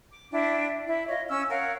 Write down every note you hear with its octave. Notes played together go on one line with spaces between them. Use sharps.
D6
D4 E4 G5
E4
F4 C#5 D#5
C#4 E6 F6
A#4 C#5 F5 F#5